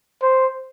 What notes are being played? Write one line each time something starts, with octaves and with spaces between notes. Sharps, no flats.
C5